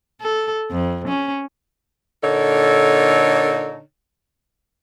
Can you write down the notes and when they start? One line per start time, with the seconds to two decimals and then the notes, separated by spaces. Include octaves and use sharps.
0.21 A4
0.71 F2
1.08 C#4
2.23 A#2 D3 D#4 A4 C#5